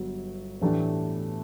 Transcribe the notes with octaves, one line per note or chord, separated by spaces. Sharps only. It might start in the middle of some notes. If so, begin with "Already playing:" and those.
Already playing: G1 G2 F#3
A2 E3 A3 D4 G4